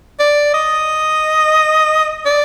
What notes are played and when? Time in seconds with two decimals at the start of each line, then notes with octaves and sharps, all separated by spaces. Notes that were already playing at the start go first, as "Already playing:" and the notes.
0.19 D5
0.54 D#5
2.26 D5